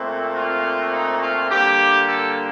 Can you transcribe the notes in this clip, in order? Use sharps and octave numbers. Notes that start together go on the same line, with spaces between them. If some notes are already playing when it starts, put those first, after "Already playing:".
Already playing: A#2 A3 C4
F4
D#4
F4
D3 G3 A#3 G4
A4